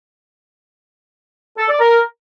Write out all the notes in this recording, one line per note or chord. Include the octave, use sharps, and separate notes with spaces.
A4
D5
A#4